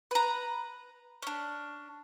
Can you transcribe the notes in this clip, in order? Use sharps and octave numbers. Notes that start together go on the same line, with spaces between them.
B4 A#5
C#4 D4